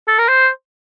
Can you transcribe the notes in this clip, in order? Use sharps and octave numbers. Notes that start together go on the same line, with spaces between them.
A4
A#4
C5